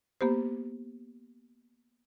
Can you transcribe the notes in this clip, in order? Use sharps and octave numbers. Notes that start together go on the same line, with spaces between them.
A#3 B3 G4 C5